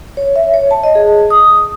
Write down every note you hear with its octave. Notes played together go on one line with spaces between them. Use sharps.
C#5
E5
C#5
A5
D#5
G#4
D#6